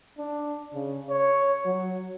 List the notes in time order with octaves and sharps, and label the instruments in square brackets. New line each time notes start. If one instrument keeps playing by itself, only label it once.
[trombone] D4
C#3
C#5
F#3